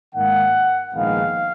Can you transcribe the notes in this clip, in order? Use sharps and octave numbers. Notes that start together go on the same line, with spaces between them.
G#2 D#3 A#3 F#5
A#1 G#2 D#3 G#3 B3 F5